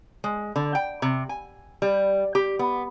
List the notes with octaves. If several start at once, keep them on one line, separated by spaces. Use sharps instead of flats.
G#3
D3
G5
C3
G#5
G3
G4
B3